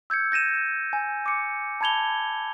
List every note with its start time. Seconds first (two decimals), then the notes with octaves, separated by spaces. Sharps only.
0.10 E6 G6 G#6 C#7
0.32 G6 A#6 D#7 E7
0.93 G#5
1.26 D6 C#7
1.81 A5 B5 G#6 F7 G7